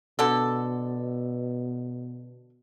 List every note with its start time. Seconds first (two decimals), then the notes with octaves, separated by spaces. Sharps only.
0.19 B2 D3 A4